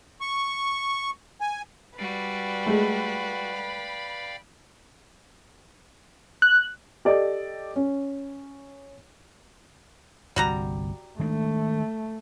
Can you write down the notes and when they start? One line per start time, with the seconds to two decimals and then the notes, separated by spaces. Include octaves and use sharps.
0.21 C#6
1.41 G#5
1.98 G3 F#4 B4 D5 F5 G5
2.66 G#3 A3
3.54 B5
6.42 F#6
7.05 G4 A4 D5 D#5
7.76 C#4
10.36 G1 C2 G3 F#4 A#5
11.19 D#3 G#3 A3 D4